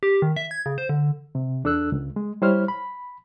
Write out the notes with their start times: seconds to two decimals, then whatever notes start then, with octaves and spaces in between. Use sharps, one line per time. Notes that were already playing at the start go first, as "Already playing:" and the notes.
0.03 G4
0.22 D#3
0.36 E5
0.51 G#6
0.66 C#3
0.78 C5
0.89 D3
1.35 C3
1.64 E2 D4 A4 E6 F#6
1.92 C#2
2.16 G#3
2.42 G3 E4 C5 C#5 F6
2.68 B5